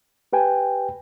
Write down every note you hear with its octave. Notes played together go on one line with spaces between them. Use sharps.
G4 B4 G5 G#5